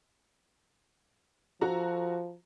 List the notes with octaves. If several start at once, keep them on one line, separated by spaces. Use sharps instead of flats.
F3 F#4 A4 A#5